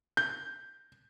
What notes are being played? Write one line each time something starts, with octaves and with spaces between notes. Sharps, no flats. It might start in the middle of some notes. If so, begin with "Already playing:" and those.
G6